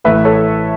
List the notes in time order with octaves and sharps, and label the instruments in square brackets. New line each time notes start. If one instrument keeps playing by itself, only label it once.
[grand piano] A1 A2 A3 [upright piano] B4 E5
[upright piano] A4 C#5